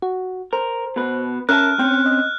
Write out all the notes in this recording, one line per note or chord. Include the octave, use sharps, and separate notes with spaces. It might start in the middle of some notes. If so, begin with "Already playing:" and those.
F#4
A#4 C5
B2 B4
C#4 A#4 E5 A5 F6 F#6
C4 C#4 G5
D#5